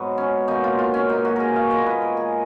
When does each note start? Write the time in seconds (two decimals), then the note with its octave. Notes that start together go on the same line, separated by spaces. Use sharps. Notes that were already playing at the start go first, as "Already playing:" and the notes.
Already playing: G#2 F#3 B3
0.18 C#4
0.48 B2 F#3 A#3 D#4
0.64 F4
0.79 F4
0.94 C#4
1.09 B2 A#3 D#4
1.25 F#4
1.36 G#4 A#4
1.56 F5
1.71 A#2 G#3 B3 D#5
1.86 B4
2.02 A#4
2.17 G#4